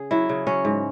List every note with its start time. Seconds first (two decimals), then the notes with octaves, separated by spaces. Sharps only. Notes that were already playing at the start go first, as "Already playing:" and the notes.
Already playing: C#3 G#4
0.11 F#3 E4
0.29 C#3
0.47 F#3 C#4
0.65 G#2